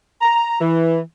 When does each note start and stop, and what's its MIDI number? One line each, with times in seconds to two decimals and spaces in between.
0.22 0.59 82
0.61 1.00 52